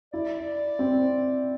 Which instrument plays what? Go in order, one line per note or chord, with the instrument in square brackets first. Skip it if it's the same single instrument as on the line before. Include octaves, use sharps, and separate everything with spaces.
[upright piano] E4 [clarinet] D5
[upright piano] C4